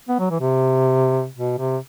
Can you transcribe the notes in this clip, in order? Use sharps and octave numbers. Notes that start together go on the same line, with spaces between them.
B3
F#3
E3
C3
B2
C3